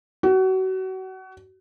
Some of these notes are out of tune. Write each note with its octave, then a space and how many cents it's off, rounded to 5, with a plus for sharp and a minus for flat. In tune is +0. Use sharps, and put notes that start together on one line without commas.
F#4 +30